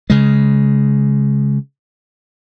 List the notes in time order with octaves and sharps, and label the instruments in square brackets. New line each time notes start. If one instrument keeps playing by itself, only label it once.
[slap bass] C#3 G#3